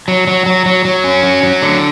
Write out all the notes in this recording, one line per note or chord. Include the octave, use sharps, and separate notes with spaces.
F#3
F#3
F#3
F#3
F#3
C#4
F#3
F#3
D3